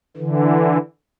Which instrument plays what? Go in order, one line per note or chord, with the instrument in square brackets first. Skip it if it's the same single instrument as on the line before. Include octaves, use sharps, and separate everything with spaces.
[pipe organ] D3 E3